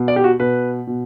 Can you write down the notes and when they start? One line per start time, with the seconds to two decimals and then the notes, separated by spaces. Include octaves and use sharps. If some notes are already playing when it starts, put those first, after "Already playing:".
Already playing: B2
0.08 D5
0.16 G4
0.24 F#4
0.40 B2 B4
0.87 B2